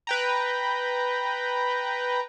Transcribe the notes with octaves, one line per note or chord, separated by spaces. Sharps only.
B4 G5 A#5